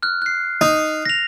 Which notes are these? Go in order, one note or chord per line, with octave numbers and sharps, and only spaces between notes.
F6 F#6
F#6 C7
D#4
A#6 F7